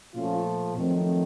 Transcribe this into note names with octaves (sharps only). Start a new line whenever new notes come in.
A#2 F3 A3 C#4 F4
F2 D#3 F#3 A3 C4